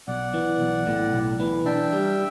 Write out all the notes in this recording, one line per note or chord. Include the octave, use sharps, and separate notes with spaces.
B1 D5 F#5
E3
B1
A2
B1
E3
D4 E5 G5
G3